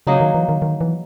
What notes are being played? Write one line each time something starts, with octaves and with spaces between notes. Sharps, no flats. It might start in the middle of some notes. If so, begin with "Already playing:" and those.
C#3 F#3 A#3 D#4 G#4
D#3
E3
D#3
D#3
E3